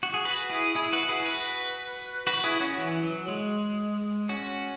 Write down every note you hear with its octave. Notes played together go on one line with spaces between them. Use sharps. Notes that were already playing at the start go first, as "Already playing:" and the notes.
F#4
G#4
F#4 B4
E4 G#4
E4 G#4
F#4 B4
E4 G#4
F#4 B4
F#4 B4
E4 G#4
C#4 F#4
E3
F#3
G#3
C#4 F#4